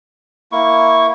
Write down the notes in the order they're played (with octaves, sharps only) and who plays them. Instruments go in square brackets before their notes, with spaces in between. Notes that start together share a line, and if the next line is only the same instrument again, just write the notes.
[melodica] A#3 E4 C#6